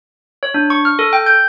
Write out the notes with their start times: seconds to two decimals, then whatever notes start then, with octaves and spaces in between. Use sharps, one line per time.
0.43 C#5
0.54 D4
0.70 C#6
0.85 F6
0.99 A4
1.13 G5
1.26 G6